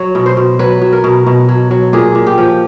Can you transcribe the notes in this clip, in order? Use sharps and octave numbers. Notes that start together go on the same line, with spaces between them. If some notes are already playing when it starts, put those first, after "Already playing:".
Already playing: F#3 C#5
B2
C5
B2
F#3 B4
F#3
A#4
B2
B2
F#3
F#3
A#2 G#4
A#2
G4
F3